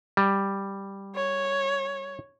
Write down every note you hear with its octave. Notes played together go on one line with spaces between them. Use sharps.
G3
C#5